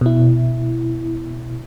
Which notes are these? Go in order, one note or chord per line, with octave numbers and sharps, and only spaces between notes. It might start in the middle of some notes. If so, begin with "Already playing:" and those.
B2 E4